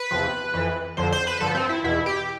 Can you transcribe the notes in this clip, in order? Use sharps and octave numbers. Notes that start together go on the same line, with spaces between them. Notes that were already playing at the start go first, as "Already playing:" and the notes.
Already playing: B4
E2 C3 F3
F2 E3
F2 D3 F3 C5
C5
B4
G2 D3 F3 A4
C4
E4
E2 B2 E4
G4